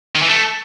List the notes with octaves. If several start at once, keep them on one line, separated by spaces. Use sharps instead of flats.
D#3
E3
A3